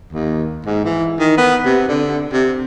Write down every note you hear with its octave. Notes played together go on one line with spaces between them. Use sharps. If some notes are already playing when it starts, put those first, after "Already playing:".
D#2
G#2
E3
D#3
B3
C3
D3
C3